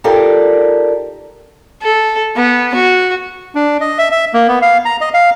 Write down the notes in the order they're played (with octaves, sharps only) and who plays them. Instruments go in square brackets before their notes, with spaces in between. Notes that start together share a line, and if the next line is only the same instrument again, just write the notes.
[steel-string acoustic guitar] D#4 F4 G4 A4 A#4 D5
[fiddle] A4
B3
F#4
[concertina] D4
D#5
E5
E5
A#3
B3
F5
A#5
D#5
F5